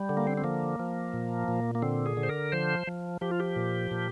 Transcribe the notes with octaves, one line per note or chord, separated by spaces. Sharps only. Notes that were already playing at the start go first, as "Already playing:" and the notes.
Already playing: G3
D3
A#3
C4
C4
F3 A#3
F3
A#2
A#2
A#3
D3 C4
G#4
D3
C5
A#4
F3 C5
F3
F3 G4
F4
G4
A#2
A#2